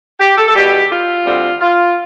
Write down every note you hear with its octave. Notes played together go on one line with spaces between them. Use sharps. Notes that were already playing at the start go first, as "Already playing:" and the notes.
G4
A4
A4
E2 B2 G3 G4
F4
D2 D3 G3 C4
F4